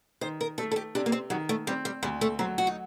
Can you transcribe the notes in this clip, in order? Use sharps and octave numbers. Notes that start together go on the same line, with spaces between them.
D#3 C5
A#4
A3 A4
A4
G4
C3 D4
A#3
C4
D#3 F#3
A3
G3 C4
G3
D2 G3
A3
F#3 C4
F#4
D#4